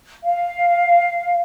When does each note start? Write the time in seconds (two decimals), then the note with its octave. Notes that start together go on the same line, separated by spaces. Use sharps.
0.24 F5